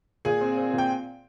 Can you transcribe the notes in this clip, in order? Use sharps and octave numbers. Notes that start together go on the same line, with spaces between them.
A#2 G#4 G#5
C4
C4
A#2
G5